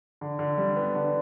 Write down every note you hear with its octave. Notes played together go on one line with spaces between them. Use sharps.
D3
D3
G3
B3
D3